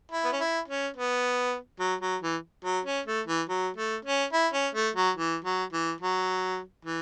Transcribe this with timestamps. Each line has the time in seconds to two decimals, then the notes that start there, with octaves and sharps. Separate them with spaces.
0.12 E4
0.25 B3
0.32 C#4
0.40 E4
0.68 C#4
0.97 B3
1.80 F#3
2.01 F#3
2.22 E3
2.65 F#3
2.85 C#4
3.06 A3
3.27 E3
3.49 F#3
3.76 A3
4.05 C#4
4.33 E4
4.54 C#4
4.75 A3
4.96 F#3
5.17 E3
5.44 F#3
5.73 E3
6.01 F#3
6.85 E3